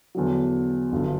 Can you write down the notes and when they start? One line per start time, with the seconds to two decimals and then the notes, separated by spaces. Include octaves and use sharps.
0.15 E2 D3 F#3
0.92 G1 G2 F#3